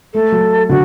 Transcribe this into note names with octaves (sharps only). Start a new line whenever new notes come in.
A3 A4
F#3
D3 F#4